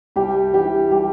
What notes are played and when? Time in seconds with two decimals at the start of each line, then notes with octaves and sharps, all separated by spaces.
0.16 C2 G3 G4
0.53 E3 G3 G4
0.91 G3 G4